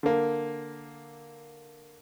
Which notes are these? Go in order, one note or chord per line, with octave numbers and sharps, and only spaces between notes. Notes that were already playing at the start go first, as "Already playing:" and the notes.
D3 A#3